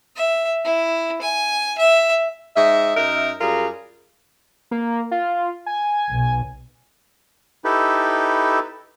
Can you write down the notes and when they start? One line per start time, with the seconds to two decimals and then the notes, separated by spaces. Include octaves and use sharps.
0.16 E5
0.65 E4
1.22 G#5
1.79 E5
2.56 G#2 D#5 E5
2.96 F#2 D#4 A#4 E5
3.41 F#2 G3 F4 G#4 A#4
4.71 A#3
5.11 F4
5.66 G#5
6.11 B1
7.65 D#4 E4 G4 A4 B4